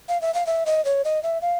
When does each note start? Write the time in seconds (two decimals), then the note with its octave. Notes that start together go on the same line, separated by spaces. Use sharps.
0.09 F5
0.22 E5
0.34 F5
0.47 E5
0.66 D#5
0.85 C#5
1.05 D#5
1.23 E5
1.42 F5